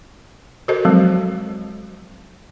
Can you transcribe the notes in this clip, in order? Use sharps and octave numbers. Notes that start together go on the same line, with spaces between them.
F#4 A4 A#4 C5 D#5
F3 F#3 G#3 C4